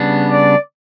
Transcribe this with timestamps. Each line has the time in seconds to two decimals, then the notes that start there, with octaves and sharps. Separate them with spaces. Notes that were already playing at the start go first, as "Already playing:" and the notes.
Already playing: C#3 G3 B3 D4
0.29 D5